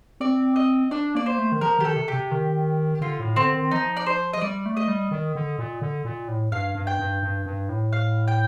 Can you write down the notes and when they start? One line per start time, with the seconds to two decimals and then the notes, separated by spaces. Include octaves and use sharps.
0.20 C4 D5
0.56 D#5
0.91 D4 D5
1.15 A#3 D5
1.26 C5
1.38 A3
1.52 D#3
1.61 F3 A#4
1.79 D#3 G4
1.85 A4
1.96 C3
2.08 G4
2.13 C3
2.31 D#3
3.01 D3 F4
3.20 A2
3.36 D3 C4
3.54 D#3
3.71 F3 D#4
3.97 D5
4.06 C5
4.33 D#5
4.41 G3 D5
4.66 A3
4.77 D#5
4.88 G3
5.11 D#3
5.35 D3
5.59 A#2
5.81 D3
6.05 A#2
6.28 A2
6.52 G2 F5
6.75 G2
6.87 G5
6.99 G2
7.23 G2
7.46 G2
7.69 A2
7.93 F5
8.28 G5